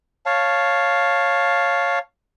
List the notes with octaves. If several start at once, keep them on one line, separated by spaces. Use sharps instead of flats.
C#5 F5 A5